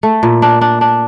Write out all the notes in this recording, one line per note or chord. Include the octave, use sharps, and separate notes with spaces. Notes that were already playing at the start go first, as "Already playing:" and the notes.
A3
A#2
D4
D4
D4